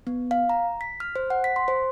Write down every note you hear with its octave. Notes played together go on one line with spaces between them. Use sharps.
B3
F5
A#5
B6
F6
C5
F#5
B6
C6
C5